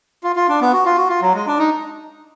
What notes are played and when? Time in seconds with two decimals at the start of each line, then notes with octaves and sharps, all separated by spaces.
0.23 F4
0.36 F4
0.49 D4
0.61 B3
0.73 F#4
0.86 F4
0.97 F#4
1.09 F4
1.22 F#3
1.34 G#3
1.47 D4
1.59 D#4